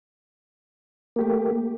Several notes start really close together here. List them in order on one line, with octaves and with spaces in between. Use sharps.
A#3 G4 A3